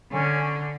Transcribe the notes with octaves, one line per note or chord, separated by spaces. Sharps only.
D3 C#4